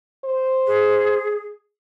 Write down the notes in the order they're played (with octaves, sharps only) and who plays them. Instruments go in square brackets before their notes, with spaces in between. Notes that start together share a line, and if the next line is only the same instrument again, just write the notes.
[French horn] C5
[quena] G#4